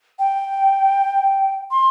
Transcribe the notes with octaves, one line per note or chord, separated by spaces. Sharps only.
G5
C6